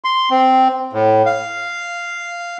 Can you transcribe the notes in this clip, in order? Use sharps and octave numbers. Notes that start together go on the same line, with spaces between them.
C6
C4
A2
F5